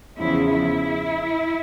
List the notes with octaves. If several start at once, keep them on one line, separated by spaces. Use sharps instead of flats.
E2 C#3 F3 E4
E4